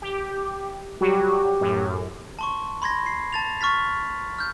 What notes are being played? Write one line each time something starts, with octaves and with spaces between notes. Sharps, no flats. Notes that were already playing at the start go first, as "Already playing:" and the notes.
G4
F#3 G3 F#4 G4
F#2 A2
A5 C6 C#6
B5 C6 G#6 A#6
C7
A5 A6 F7
C#6 F6 A6 B6
F6 G6